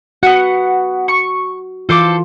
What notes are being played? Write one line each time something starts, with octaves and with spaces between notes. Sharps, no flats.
B3 F#4 F#5
C#6
E3 F4 A4 C5 D6